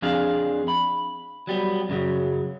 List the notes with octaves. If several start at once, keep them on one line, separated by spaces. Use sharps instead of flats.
F2 C4 D4 G#4 F5
B5
F#3 G3 B3
F#2 C#3 F#3